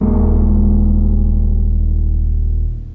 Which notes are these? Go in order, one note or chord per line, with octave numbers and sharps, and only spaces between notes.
D#1 G#3 A#3